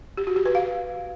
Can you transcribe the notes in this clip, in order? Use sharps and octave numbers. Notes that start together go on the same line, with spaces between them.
G4
F#4
G4
B4
F5